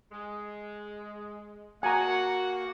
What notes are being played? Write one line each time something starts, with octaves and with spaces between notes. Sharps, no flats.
G#3
A#3 F#4 F#5 G#5 A#5